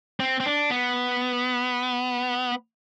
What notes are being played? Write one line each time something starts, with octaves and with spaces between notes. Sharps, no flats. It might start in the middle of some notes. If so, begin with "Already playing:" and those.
C4
C4
D4
B3